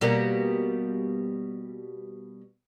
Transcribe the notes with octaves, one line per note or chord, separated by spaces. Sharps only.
B2 G3 A#3